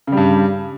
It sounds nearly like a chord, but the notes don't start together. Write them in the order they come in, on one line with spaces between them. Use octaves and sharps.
C#3 G3 G2